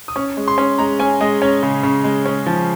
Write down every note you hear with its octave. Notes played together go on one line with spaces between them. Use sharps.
D#6
C#4 C#6
G#3
C6
C#4
G#3 A#5
C#4 G#5
G#3 D#5
C#4 C#5
C#3
C#3
G#3
C#4
F3